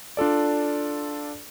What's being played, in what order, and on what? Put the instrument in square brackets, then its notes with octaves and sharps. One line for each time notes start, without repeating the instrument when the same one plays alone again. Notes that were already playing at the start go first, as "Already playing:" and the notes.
[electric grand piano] D4 F4 A4 D5